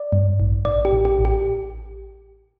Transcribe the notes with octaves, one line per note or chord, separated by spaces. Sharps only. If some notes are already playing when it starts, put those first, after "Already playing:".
Already playing: D5
G2
A1
A1 D5
G4
A1
G4
A1
G4